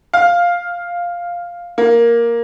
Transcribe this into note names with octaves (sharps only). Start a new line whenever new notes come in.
F5
A#3